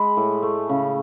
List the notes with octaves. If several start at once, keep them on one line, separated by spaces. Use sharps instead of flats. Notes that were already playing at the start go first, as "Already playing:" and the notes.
Already playing: G#3 B5
A2
A3
C#3